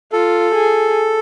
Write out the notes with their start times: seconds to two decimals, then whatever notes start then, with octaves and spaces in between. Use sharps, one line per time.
0.12 F4 A4
0.55 G#4